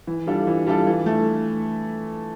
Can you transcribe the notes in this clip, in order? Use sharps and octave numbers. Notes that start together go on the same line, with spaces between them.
E3
G3 D4 F4 A4
E3
G3 D4 F4 A4
E3
A3